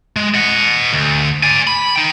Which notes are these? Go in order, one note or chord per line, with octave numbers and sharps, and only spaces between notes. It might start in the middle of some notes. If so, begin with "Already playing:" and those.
G#3
D#5 F#5
D2
D5 G#5
B5
D#4 G5